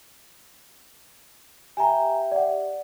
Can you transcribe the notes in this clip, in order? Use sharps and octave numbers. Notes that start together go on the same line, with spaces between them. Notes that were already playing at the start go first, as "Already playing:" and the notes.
G4 E5 G5 G#5 A#5
D5 F#5